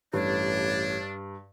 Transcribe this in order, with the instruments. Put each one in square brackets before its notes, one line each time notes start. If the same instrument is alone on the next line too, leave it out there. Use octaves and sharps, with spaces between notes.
[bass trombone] A1 [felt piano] G2 [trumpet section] D4 [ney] C#5